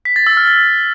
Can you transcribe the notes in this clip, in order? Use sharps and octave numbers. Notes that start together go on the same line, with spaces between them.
B6
A6
E6
F6
A6